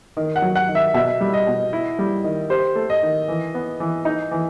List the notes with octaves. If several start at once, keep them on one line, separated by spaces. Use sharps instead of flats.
D#3
F#5
F#3
F#5
D#3
E5
B2 E5
G3
D#5
B2
E4
G3
D#3
G4 C5
A3
D#5
D#3
E3
B3
E3
D#4
E3